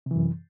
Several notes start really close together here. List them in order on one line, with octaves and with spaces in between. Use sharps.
C3 E3 F#2